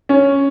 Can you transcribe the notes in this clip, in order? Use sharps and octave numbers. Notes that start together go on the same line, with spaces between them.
C#4